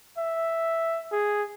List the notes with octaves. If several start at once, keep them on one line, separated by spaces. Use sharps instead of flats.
E5
G#4